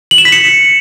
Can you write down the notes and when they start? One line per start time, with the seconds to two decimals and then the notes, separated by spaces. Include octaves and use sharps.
0.11 F#7
0.18 E7
0.25 B6
0.32 C#7